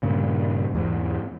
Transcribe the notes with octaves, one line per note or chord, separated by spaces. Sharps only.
G2 A#2 C#3
E2 G#2